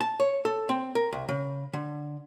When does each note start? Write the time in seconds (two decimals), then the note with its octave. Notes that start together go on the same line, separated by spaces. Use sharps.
0.01 A5
0.20 C#5
0.45 A4
0.69 C4
0.95 A#4
1.12 C2
1.29 C#3
1.73 D3